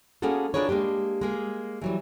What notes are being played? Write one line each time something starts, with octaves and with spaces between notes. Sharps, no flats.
A#3 B3 C#4 F#4 G#4 A4
D4 F4 G#4 A#4 B4 C#5
G#3 A#3 D4 G4
G#3 A#3 G#4
E3 F#3 G3